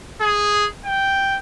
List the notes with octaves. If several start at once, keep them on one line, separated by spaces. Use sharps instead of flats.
G#4
G5